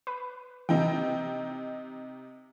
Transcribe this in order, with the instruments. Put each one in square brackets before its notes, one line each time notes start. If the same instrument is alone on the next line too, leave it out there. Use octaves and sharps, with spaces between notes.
[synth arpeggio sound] B4
[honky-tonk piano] C3 D#4 G5 [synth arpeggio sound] E3